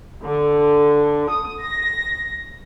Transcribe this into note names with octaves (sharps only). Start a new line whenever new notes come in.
D3
D#6
A#6